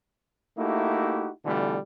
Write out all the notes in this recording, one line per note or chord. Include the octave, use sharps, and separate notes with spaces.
A3 A#3 D#4 E4 F#4 G4
B2 D3 E3 G3 A3 F4